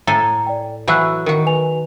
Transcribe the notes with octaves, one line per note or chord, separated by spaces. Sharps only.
A2 A4 G#5 A#5
D5 G5
E3 F#3 F#4 B5 E6 F#6
D#3 F#4 A#4
B4 G#5 F7